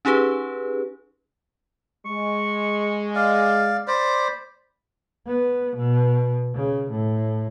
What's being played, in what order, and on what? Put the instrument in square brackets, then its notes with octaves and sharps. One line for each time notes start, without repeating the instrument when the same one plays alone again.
[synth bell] C#4 D#4 G4 G#4 B4
[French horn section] G#3 [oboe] C#6
[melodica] D5 F5
[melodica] C5 D5 [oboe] B5
[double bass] B3
B2
C#3
A2